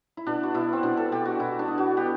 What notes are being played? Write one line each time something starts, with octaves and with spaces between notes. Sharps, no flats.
E4
B2 D4
F#4
B2 E4
C4
B2 D4
A4
B2 G4
F#4
B2 E4
D4
B3
F#4
B3 G4